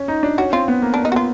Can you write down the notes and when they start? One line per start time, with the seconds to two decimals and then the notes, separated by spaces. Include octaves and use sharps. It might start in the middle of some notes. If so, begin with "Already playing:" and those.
Already playing: C#4
0.08 D#4
0.23 D4
0.38 C#4 F#4
0.53 C4 F4
0.68 B3
0.82 A#3
0.94 A#3 D4
1.05 D#4
1.12 B3 F4 F#4